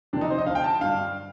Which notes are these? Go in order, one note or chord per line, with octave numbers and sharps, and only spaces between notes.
F2 C3 D#3 D4
D#4
C5
D#5
D2 D3 F5
G5
A5
G2 D3 F5